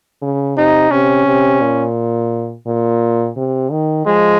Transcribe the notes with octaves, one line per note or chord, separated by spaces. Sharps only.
C#3
C3 D#4
C3 C#4
C3
A#2
A#2
C3
D#3
F3 G#3